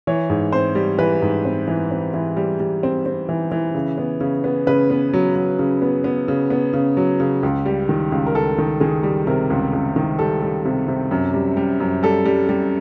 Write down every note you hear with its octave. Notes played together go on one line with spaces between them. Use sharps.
E3 C#5
G#2
C4 C5
G3
E3 B4
G#2
C4
E3
C4
E3
G3
G3
C4
C4
E3
E3
C#3
B3
C#3
B3
C#3 B4
B3
F#3
F#3
C#3
B3
B3
C#3
B3
C#3
F#3
C#3
C#2
G3
D#3
C#2
A#4
C#2 A4
D#3
D#3 G#4
G3
C3 A#4
C#2
C#2
D#3
G3 A4
G3
C3
C3
F#2
G3
G3
F#2
G3 A4
G3
G3